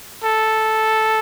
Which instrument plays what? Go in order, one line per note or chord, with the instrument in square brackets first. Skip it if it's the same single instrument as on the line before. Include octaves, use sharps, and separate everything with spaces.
[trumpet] A4